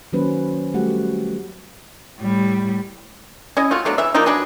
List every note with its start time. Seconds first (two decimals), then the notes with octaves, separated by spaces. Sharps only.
0.13 D#3 F#3 A#3 C#4 B4 C5
0.74 G3 A3 F#4 G4 F#5
2.18 A2 G3
3.57 C#4 E4 D#5
3.71 A3 F4 F#4
3.85 B2 F#3 A3 D4
3.98 E3 E5
4.14 F3 A#3 D4 D#4
4.26 F#3 D4 G#4 B4